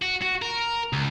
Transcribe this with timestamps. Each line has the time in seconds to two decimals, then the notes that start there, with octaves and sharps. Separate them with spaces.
0.02 F#4
0.22 F#4
0.42 A#4
0.93 C#2